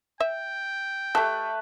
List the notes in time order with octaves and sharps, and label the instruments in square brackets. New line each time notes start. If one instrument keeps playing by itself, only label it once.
[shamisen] E5 [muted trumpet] G5
[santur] A3 B4 [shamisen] G4 A4